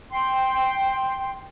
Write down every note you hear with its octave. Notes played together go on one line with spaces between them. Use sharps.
G5 C6